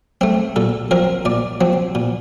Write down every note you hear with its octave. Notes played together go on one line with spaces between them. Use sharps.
A3 C4
A#2 A4
F3 C4 A#4
A#2 D5
F3 C4
A#2